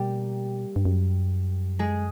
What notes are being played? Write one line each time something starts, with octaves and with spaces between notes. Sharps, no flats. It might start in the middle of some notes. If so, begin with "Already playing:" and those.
Already playing: B2 G3 A#3 G4
G2
F#2
G#3 G#4